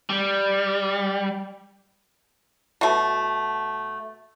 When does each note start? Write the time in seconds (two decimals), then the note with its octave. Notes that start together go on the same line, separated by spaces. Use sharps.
0.10 G3
2.81 B2 A3